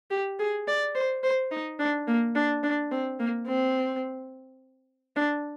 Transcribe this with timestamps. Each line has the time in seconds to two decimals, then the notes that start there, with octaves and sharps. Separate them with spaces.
0.11 G4
0.39 G#4
0.68 D5
0.95 C5
1.23 C5
1.51 D#4
1.79 D4
2.07 A#3
2.35 D4
2.63 D4
2.91 C4
3.20 A#3
3.48 C4
5.16 D4